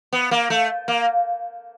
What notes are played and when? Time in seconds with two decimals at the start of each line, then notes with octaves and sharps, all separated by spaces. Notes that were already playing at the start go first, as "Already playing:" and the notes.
0.13 B3
0.31 A#3
0.50 A3
0.88 A#3